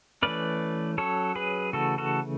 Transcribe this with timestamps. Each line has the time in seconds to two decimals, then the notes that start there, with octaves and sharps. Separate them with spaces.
0.22 E3 A3 C#4 B4 D5
0.98 F#3 C#4 A4 C#5
1.35 G#4 B4
1.73 C#3 E3 A3 F#4 A4
1.98 F#4 A4